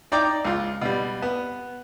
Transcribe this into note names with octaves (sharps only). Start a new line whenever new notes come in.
D#4 D5 G5 A#5 D6
C#2 F4
B2 G3
B3